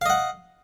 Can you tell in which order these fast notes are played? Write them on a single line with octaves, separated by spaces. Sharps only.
F5 D#5 F#5